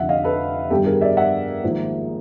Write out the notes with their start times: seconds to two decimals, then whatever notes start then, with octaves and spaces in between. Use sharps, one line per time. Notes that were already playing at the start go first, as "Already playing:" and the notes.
Already playing: F1 F2 D3 E5 F#5
0.09 D#5 F5
0.24 A4 B4
0.70 G2 D#3 G3 B3 G4 A4
0.86 G#4 A#4
1.01 D5 E5
1.17 E5 F#5
1.63 G#1 G#2 F3 A#3